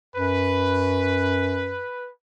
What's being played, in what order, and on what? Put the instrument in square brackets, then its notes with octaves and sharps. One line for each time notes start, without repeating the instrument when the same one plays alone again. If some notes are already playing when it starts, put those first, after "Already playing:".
[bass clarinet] F#2 [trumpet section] B4